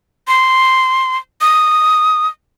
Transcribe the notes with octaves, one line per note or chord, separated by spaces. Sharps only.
C6
D#6